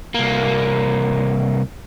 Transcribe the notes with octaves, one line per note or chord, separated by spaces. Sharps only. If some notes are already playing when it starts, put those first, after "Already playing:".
C2 A#3